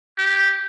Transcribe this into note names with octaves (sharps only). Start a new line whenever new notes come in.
G4